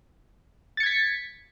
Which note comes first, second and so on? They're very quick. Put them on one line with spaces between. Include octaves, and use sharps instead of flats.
A6 C#7 G#6 B6